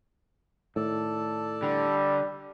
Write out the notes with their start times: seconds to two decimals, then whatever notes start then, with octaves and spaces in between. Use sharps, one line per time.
0.76 A2 D#3 A4 D5 A5
1.62 D3 G3